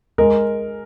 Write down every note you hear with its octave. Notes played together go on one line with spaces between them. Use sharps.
G#3 A#4